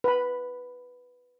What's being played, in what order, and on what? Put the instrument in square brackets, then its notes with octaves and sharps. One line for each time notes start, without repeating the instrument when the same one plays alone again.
[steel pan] B4 B5